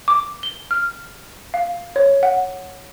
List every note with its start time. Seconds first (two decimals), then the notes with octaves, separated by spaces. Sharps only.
0.08 D6
0.43 G7
0.71 F6
1.54 F5
1.96 C#5
2.23 F#5